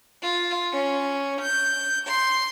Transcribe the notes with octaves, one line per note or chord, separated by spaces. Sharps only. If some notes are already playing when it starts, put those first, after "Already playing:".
F4
C#4
G6
C6